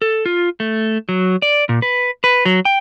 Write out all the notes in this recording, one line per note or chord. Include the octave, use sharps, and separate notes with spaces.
A4
F4
A3
F#3
D5
A#2
B4
B4
F#3
G5